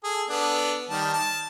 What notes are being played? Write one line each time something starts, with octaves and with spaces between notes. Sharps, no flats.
G#4 A4
B3 D4 A4
D#3 G3 A5
A5